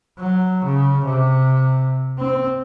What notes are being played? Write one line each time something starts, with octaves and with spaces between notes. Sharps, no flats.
F#3
C#3
C3
C4